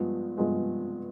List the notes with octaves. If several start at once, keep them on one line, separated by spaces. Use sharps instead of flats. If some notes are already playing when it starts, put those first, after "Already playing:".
Already playing: G2 F3 G#3 B3
G2 F3 G#3 B3